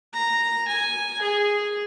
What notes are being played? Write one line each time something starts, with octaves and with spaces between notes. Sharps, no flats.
A#5
G#5
G#4